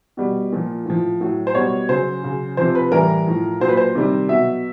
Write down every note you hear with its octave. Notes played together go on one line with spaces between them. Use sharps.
B2 G3
A#2 F3
A2 F3
A2 F#3
C5
B2 G3 C#5
C#3 F#3 C5
C#3 F#3
C3 F3 C5
B4
A2 E3 G3 A#4
A2 F3
A#2 F#3 C5
B4
C5
C3 D#3 G3
B2 F#3 E5